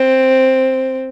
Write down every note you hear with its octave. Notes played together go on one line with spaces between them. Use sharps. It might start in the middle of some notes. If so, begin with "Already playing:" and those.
Already playing: C4